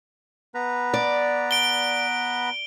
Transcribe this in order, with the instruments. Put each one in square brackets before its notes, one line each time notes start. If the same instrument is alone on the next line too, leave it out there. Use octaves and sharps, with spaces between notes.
[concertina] B3 B4 A#5
[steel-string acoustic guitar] D5
[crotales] D7 G7